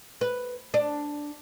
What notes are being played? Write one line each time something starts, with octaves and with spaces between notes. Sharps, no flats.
B4
D4